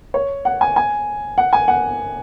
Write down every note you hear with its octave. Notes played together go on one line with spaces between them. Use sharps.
C#5
F#5
G#5
G#5
F#5
G#5
F#5